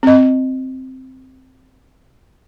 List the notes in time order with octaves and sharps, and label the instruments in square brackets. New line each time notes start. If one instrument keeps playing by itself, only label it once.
[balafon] C4 D#5